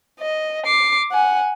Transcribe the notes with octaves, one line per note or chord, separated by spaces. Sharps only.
D#5
D6 C7
F#5 G#5